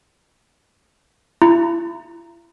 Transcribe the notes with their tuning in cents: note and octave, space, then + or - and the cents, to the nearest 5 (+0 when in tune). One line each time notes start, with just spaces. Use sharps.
E4 +40 A#5 +0